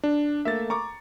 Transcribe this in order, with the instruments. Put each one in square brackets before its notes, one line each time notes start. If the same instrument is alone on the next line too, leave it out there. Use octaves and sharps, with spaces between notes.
[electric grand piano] D4
[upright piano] A3 A#3 [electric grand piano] E5 A6
[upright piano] A#5 D6 [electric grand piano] C#6